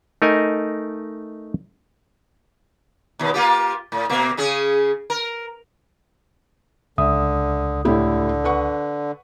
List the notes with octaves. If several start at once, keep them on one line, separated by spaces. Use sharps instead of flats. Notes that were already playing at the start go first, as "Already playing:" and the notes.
A3 D#4 A#4 D#5 G#5
D#2 B2
A#3 F4 G4
A2
B2 A#3
C#3 C#4 G#4
A#4
C#2 D3 E5 D#6
A2 D3 E4 G4
B4 F#5 C#6